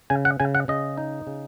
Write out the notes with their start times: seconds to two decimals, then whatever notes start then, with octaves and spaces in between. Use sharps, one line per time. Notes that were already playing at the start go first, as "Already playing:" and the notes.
0.10 C#3 G#5
0.25 F#5
0.40 C#3 G#5
0.55 F#5
0.68 C#3 D#5
0.98 D#4
1.27 C#3